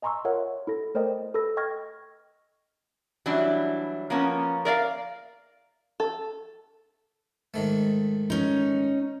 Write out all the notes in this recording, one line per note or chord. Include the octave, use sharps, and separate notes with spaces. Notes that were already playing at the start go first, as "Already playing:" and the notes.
D#5 G#5 A#5 C6 C#6 E6
F4 A#4 C#5 D#5 E5 F#5
E4 A4 A#6
A3 A#4 C5 D5 D#5 G5
A4 B4 B5 E6 A#6
D#5 G5 C#6 F6 G#6 A#6
E3 F#3 G3 D4 E4
F3 A#3 B3 C#4
A#4 D5 D#5 F5
A4
G#2 D#3 A3
C#4 D#4